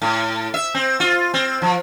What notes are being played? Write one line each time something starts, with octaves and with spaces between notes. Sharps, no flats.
A2
E5
C4
F4
C4
F3